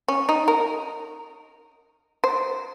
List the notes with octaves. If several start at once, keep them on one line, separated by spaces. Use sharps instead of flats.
C#4
D#4
A#4
C5